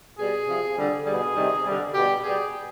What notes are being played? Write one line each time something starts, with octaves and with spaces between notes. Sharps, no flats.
B2 G3 G#4
C3 F3
D3 G3
B2 G3 G#4
C3 D#3 G3
D3 G3
B2 G3 G4
B2 G3 G#4